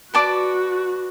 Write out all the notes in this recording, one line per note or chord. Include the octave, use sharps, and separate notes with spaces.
F#4 B4 D5 A5 D6